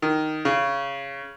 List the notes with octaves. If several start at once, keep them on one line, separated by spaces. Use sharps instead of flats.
D#3
C#3